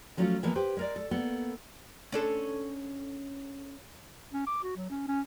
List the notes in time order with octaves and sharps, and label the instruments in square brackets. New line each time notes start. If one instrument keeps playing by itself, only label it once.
[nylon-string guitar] F3 F#3 A3 C#4 D#4 F4
E3 F3 G#3 A#3 B3
G4 B4 C5
G#3 A#4 D5
A4
A#3 B3 A4
[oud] C#4 D4 A4
[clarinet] C#4
D6
F#4
F#3
C#4
C#4